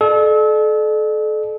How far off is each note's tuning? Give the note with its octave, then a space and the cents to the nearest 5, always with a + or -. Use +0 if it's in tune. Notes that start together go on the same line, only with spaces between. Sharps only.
A4 -35 D5 +45